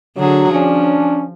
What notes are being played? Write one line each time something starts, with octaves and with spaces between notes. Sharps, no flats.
D3 F#3 F#4 G#4
F3 C#4 D4